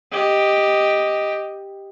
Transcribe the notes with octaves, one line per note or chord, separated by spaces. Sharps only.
G4 D#5